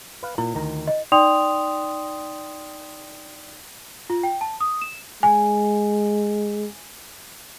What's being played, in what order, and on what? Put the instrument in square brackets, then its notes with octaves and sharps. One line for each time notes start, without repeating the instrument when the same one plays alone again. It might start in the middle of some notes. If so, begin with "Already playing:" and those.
[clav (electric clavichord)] B4 F5
[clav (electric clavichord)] A#2 [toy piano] E4
[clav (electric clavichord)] D2 D#3 A#5
[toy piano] D#5
[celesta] D#4 D5 G5 C6 D#6 F7
F4
G5
A5
D#6
E7
[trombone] G#3 [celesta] G#5